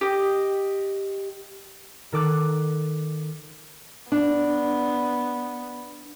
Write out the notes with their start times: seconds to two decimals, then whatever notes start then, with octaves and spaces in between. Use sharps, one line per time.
0.01 G4 D#5
2.12 D#3 A4 D6 F#6
4.12 B3 D4